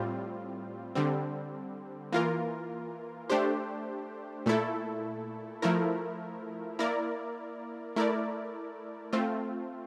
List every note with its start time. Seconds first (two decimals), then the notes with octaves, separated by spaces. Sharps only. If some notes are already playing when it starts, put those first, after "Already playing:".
Already playing: A2 G3 C4 F4
0.95 D3 G3 C4
2.12 E3 A#3 F4 A#4
3.30 A3 D4 G4 C5
4.46 A#2 A3 E4 A4
5.62 F3 A3 E4 A#4
6.79 A#3 E4 A#4 D5
7.96 A3 E4 A#4 D5
9.13 A3 C4 F4